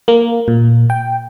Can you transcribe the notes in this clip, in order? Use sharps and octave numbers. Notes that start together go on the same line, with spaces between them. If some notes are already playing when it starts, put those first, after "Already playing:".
A#3
A#2
G5